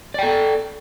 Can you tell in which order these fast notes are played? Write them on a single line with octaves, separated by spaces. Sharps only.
D5 G5 A4